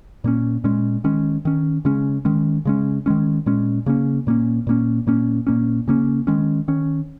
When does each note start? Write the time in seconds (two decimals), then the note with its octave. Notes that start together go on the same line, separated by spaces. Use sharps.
0.24 A#2 A#3 C#4
0.64 A#2 G#3 C#4
1.04 D#3 G#3 C#4
1.45 D#3 C#4
1.85 C#3 G#3 C#4
2.25 D#3 G#3 C#4
2.65 C#3 G#3 C#4
3.06 D#3 G#3 C#4
3.46 A#2 G#3 C#4
3.86 C#3 A#3 C#4
4.27 A#2 A#3 C#4
4.67 A#2 A#3 C#4
5.07 A#2 A#3 C#4
5.47 A#2 A#3 C#4
5.88 C#3 A#3 C#4
6.27 D#3 G#3 C#4
6.68 D#3 C#4